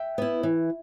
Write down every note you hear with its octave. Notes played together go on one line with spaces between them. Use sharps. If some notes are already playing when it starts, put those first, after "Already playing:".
Already playing: E5 G5
B3 E4
E3